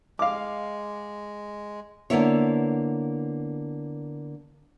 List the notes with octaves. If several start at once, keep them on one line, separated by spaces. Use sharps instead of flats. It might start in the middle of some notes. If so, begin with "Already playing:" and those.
G#3 F5 D6
D3 A#3 B3 E4 C#5